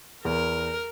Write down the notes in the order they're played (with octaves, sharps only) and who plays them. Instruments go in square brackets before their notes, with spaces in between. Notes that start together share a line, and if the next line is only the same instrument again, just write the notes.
[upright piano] E2 [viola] A#4